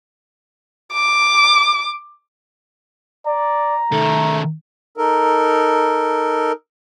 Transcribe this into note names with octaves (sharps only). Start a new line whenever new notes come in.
D6
D5 A#5
D#3 A3 A4
D#4 A4 A#4